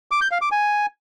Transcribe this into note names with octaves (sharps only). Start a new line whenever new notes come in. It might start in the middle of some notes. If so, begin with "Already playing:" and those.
D6
G6
F5
D6
G#5